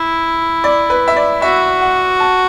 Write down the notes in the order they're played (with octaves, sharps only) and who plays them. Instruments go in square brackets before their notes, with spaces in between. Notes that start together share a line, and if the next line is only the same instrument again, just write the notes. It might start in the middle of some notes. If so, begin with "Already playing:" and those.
Already playing: [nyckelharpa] E4
[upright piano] D5
B4
E5
D5
[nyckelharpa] F#4 [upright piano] E5
[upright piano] F#5
A5